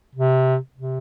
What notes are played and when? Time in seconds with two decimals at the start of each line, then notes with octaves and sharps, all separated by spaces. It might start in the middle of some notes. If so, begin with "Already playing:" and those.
0.15 C3
0.75 C3